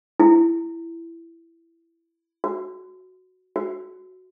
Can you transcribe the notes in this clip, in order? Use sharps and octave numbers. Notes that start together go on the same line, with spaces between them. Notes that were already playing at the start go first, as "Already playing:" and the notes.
E4
F#4
F#4